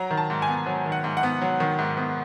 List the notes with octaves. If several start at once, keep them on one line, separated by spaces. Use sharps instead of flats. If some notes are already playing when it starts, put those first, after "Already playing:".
Already playing: F#3 A#5
D#3
A5
G#2
G#5
B3
F#3
D#3
F#5
G#2
F#5
B3
F#3
D#3
G#2
B3